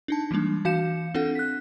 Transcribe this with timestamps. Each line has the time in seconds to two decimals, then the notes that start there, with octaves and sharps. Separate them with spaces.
0.08 D4 D#4 A5
0.31 E3 G3 G#3 A#3 D4
0.65 E3 F#4 F5 G6 C#7 E7
1.14 C4 D4 F4 A4 F#5
1.35 F#6 B6